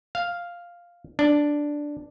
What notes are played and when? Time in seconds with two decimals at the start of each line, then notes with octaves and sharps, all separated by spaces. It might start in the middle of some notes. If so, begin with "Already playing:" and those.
0.15 F5
1.19 D4